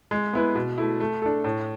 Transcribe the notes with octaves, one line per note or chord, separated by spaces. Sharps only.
G#3
B3 E4 B4
B2
A3 E4
A3
D4 A4
A2